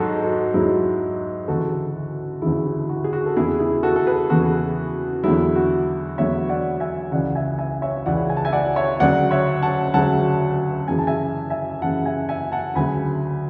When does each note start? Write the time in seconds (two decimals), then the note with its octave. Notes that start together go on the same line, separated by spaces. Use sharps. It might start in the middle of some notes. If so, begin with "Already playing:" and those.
Already playing: G#2 F#3 F#4 G#4 A4
0.23 F#4 A4
0.54 G#2 F#3 E4 G#4
1.48 D2 C#3 E3 F#4 A4
2.42 D2 C#3 E3 E4 G#4
2.65 E4
2.89 F#4
3.04 G#4
3.13 F#4
3.26 A4
3.36 E2 C#3 E3 E4 G#4
3.59 E4 G#4
3.83 F#4 A4
3.96 A4
4.07 G#4 B4
4.30 E2 C#3 E3 F#4 A4
5.24 E2 D3 F#3 E4 G#4
5.56 F#4
6.18 E2 D3 F#3 C#5 E5
6.49 D5 F#5
6.80 E5 G#5
7.11 C#2 C#3 E3 D5 F#5
7.35 E5 G#5
7.59 E5 G#5
7.82 C#5 E5
8.06 C#2 C#3 E3 D5 F#5
8.30 G#5
8.37 A5
8.45 E5 G#5
8.52 D5 F#5
8.76 C#5 E5
9.00 D2 C#3 F#3 D5 F#5
9.31 C#5 E5
9.63 F#5 A5
9.94 D2 C#3 F#3 F#5 A5
10.88 F#2 C#3 E3 G#5
10.98 A5
11.07 E5 G#5
11.50 E5 G#5
11.82 F#2 C#3 E3 F#5 A5
12.06 E5 G#5
12.29 E5 G#5
12.52 F#5 A5
12.75 D2 C#3 F#3 G#5 B5